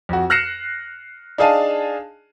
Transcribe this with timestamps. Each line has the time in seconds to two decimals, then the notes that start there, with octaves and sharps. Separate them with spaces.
0.09 F2 F#4
0.30 F6 F#6 A#6 C7 C#7 E7
1.38 D4 D#4 G#4 F5 G#5 A5